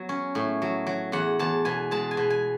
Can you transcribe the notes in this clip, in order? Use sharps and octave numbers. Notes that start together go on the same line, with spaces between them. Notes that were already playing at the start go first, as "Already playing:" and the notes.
Already playing: F#3 B3
C#4
A2
F#3
F#3
E2 F#5
E2 A5
B2 G#5
G#3 A5
G#5
B2
G#5